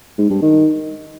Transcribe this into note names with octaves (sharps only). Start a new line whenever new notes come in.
G#2
G2
D#3